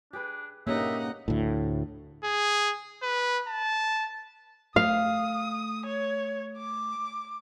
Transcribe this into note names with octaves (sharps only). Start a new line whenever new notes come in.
D4 G4 G#4 B4
G2 C#3 A#3 D#4 G4 E5 F#5
D2 A2
G#4
B4
A5
A3 F5 D#6
C#5
D6